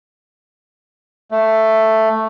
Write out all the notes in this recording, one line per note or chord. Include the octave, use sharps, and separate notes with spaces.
A3